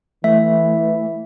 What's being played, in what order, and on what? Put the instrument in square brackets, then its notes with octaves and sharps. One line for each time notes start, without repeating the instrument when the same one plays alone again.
[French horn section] E3 [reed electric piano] A3 [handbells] E5